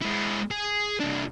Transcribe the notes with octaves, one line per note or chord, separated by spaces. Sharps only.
G#3 E4
G#4
C2 D4